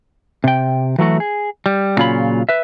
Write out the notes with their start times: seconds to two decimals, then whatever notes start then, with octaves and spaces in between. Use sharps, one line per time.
0.44 C3 G5
0.99 E3 F#3 A3 F#4
1.20 G#4
1.66 G3
1.97 A#2 C#3 F#3 F4 C#5 B5
2.49 B4 E5